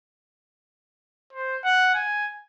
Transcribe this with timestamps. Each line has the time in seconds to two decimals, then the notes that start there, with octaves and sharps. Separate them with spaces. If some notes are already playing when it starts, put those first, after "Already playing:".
1.33 C5
1.64 F#5
1.94 G#5